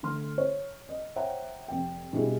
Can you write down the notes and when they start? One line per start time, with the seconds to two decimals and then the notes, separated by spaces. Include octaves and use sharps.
0.03 D3 A3 C6 F6
0.38 C#5
0.89 D#5
1.16 C5 C#5 E5 F#5 G5 A#5
1.68 F1 G5
2.13 B2 G3 D4 E4 G#4